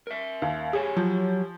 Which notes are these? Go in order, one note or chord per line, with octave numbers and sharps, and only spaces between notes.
A#4 E5
D#2
G4 G#4 C#5 G#5
F3 F#3